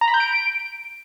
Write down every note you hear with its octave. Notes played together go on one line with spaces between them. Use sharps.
A#5
B5
G6
D7